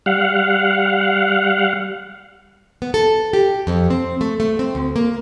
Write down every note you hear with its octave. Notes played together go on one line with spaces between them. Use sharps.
G3 F5 F#5
B3
A4
G4
F2
C4
A3
A3
C4
D2
A#3